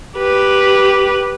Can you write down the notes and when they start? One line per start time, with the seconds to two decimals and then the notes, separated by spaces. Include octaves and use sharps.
0.17 G4 B4